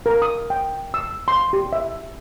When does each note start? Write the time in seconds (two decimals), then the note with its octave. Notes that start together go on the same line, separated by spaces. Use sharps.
0.06 A#4
0.22 D#6
0.50 G5
0.94 E6
1.28 C6
1.53 G4
1.73 E5